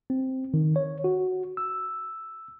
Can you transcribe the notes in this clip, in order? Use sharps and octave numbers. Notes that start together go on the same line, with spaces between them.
C4
D#3
C#5
F#4
E6